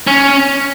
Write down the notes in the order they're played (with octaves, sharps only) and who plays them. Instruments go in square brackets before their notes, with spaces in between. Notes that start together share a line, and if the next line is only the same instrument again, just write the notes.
[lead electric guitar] C#4